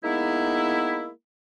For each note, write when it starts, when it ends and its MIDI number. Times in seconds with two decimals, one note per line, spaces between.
0.03 1.09 56
0.03 1.09 58
0.03 1.09 59
0.03 1.09 63
0.03 1.09 64